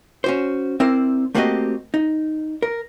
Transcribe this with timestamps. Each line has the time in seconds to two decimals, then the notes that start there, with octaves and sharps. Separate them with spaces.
0.24 C#4 F#4 C5
0.80 C4 E4 A#4 C5 D5
1.35 A3 A#3 C4 F#4 G4 D#5
1.94 D#4
2.62 A#4